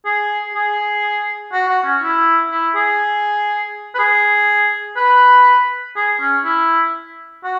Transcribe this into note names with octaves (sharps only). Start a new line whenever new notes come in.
G#4
G#4
F#4
F#4
C#4
E4
E4
G#4
B4
G#4
B4
G#4
C#4
E4
F#4